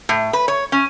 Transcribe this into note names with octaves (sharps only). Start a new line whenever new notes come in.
A2
B4
C#5
C#4